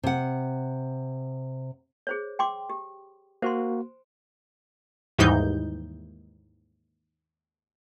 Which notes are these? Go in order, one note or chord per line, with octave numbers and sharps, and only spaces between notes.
C3 F#5
G#4 C5 C#5
G5 C6 D6
G4
A#3 F#4 C5 C6
D#2 G#2 E3 G3 D#4 G6